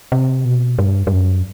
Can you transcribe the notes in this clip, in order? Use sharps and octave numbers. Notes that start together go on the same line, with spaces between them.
C3
B2
G2
G2
F#2